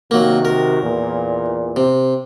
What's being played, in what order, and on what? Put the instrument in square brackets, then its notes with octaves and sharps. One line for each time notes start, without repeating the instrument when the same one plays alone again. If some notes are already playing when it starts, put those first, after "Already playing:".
[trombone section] C3 D#3 F#4 [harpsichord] F#3 A#3
[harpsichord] A#4
[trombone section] E2 A#2
[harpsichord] C3